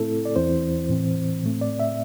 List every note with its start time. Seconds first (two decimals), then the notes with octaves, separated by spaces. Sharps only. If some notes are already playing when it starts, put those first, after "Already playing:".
Already playing: A2 A3 C4 E4 A4
0.25 D5
0.36 E2 E3 C4 E4 C5
0.90 A2 E3 C4
1.44 A2 A3 C4
1.61 D5
1.80 E5